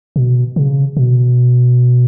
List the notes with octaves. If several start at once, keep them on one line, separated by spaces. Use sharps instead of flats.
B2
C#3
B2